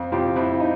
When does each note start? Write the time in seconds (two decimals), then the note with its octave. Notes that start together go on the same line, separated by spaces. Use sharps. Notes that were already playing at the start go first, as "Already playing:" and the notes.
Already playing: F2
0.12 F2 F4 G4
0.36 F2 E4
0.60 D#4